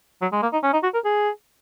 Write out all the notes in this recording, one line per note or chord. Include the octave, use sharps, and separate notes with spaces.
F#3
G#3
A#3
D#4
C#4
D#4
F#4
A#4
G#4